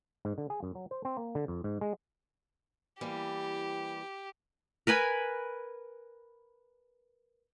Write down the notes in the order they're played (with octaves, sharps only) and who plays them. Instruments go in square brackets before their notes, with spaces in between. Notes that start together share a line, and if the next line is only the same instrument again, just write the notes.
[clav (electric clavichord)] G#2
D3
G#4
F#2
F#3
C5
C4
A#3
D3
F2
G#2
G#3
[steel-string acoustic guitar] E3 G3 A#3 [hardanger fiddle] G4
[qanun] A#4 B4 G#5 B5